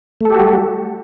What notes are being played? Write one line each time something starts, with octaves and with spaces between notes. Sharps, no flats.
G3 A3 F#4 G4 A4